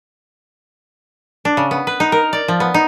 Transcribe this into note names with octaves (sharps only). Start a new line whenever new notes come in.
D4
C#3
B3
B4
D#4
A#4
D5
F3
B3
D#4